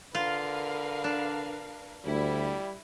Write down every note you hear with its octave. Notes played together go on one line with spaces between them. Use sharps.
D3 F4 A#4 B4 F5
D4
D2 G3 E4